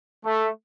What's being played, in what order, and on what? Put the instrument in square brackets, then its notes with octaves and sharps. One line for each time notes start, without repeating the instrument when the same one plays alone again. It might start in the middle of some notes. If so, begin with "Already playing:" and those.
[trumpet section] A3